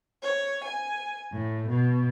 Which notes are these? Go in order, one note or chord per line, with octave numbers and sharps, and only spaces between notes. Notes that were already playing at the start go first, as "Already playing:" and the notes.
C#5
G#5
A2
B2